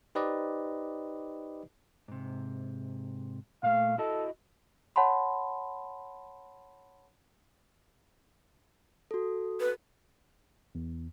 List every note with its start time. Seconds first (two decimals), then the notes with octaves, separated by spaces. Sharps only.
0.15 D#4 G4 B4 C5 D5 D#5
2.08 G#2 C3
3.63 A#2 A3 F5
3.98 E4 F#4 A4 D#5
4.96 C#5 F#5 A5 B5 C6
9.11 F#4 A4
9.60 B4
10.75 E2